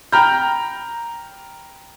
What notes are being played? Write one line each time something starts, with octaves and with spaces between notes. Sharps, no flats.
G5 A#5 B5 F6 G6